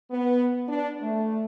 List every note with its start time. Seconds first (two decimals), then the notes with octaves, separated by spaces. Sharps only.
0.11 B3
0.68 D4
1.01 A3